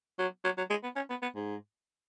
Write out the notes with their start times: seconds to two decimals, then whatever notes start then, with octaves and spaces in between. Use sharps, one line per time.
0.19 F#3
0.44 F#3
0.58 F#3
0.70 G#3
0.83 B3
0.96 C#4
1.10 B3
1.22 B3
1.36 G#2